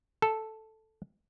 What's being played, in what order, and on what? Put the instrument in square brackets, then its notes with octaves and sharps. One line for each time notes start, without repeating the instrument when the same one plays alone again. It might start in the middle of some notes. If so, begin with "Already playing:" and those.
[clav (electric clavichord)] A4